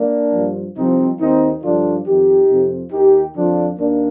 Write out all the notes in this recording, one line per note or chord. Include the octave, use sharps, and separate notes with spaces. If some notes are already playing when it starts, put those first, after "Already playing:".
Already playing: A#3 D4
G2 F3
C2 C3 F3 C4 D#4
D#2 D#3 C4 D#4
G2 D3 F3 D4 F4
F2 D#3 D#4 G4
F2 C3 F3
D#2 D#3 D#4 G4
F2 D3 F3 D4 F4
D#2 D#3 A#3 D4